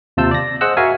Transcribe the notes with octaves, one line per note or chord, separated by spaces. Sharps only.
D#2 C3 F4 A5 E6 G6
D5 A#6
G#4 C5 D#5 F#5 E6 F#6
F#4 A#4 E5 F5 G#5